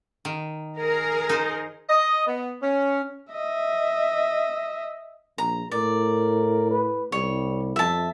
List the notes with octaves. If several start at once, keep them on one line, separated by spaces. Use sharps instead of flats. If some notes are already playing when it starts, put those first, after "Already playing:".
D#3
G#4 A#4
D#4 C5
D#5
B3
C#4
D#5 E5
A#1 A#5
A2 A#4 D5
B4
C2 G3 C#5
F2 E5 A5